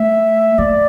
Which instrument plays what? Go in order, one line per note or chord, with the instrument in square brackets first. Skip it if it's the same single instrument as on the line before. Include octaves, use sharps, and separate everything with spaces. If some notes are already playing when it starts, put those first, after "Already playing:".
Already playing: [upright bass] A3 [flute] E5
[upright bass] A3 [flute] D5